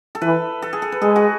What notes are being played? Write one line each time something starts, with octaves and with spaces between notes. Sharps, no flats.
A4
E3 B4
A4
G#4
A4
B4
G#3 G#4
F#4